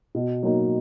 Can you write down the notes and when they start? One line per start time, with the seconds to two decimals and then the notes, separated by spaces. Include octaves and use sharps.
0.15 B2
0.43 F#3 A#3 D#4